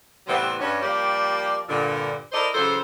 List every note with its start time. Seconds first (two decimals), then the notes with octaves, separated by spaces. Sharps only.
0.27 A2 C3 E3 G3 B3 C4
0.59 G2 C#4
0.82 F3 G3 A#3 G4 D5
1.69 G2 A#2 D3
2.32 E4 A4 A#4 C5 D5 D#5
2.54 C#3 E3 F#3 A4 C5